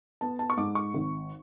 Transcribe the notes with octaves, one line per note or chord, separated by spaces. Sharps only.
B3 A5
A5
C#6
G#2 D6
C#6
G#1